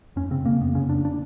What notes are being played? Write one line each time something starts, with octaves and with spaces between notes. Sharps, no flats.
F2 C#4
C#3 C4
C#3 A#3
F2 B3
C#3 C#4
F2 D4
D4